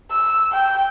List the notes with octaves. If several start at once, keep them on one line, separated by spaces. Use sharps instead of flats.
E6
G5